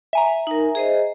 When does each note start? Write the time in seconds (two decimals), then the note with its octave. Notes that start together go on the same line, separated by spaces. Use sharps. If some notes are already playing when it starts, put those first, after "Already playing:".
0.13 E5 G#5 A#5
0.47 D#4 A#4
0.75 G#4 C5 D#5